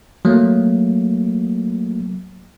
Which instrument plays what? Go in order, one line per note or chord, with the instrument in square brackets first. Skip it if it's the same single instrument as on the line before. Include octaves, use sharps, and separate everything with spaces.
[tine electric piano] F#3 A3 A#3